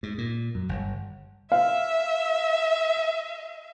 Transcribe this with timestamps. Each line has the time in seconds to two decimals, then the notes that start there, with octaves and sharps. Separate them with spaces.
0.03 G#2
0.18 A#2
0.55 F#2
0.69 G1
1.52 E5 F5